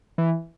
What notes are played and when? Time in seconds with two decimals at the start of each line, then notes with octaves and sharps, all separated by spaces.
0.18 E3